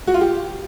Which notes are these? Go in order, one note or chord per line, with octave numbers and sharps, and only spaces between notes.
F#4
F4
G4